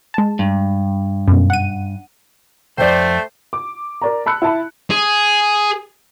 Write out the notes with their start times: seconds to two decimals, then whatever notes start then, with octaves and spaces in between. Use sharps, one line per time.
0.14 G#3 A5
0.39 G2
1.28 F#2 B2
1.50 F#5 D#7
2.78 C2 F2 A3 C5 D5 G5
3.53 D6
4.02 A#4 D5 A#5
4.26 A5 B5 E6 F#6 C#7
4.42 E4 A5 B5
4.91 G#4